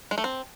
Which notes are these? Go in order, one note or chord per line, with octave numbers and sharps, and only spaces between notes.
G#3
A3
C4